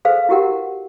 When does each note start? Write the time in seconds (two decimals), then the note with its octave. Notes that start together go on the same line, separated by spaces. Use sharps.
0.05 G#4 A4 B4 C5 F5
0.29 E4 F#4 G4 A#4 F#5